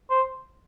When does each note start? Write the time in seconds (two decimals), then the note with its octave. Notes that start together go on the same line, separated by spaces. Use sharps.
0.10 C5